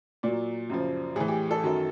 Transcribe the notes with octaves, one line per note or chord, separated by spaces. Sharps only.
A#2 F#3 D5
F#2 C#3 F3
A2 E3 G#4
G4
A4
F#2 D#3 F#3